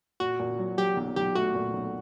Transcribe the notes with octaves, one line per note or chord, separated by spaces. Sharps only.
A#2 F#4
A#2
F#3
F#3 G4
B1
B1 G4
A3 F#4
A#2
B1